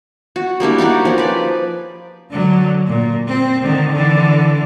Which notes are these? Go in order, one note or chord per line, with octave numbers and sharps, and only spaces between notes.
F#4
G3 A#3 D4 E4
D#4 F#4 G4 D5
F3 C#4
B4 D5
D3 F#3
A#2
C4
D3 D#3
D3 E3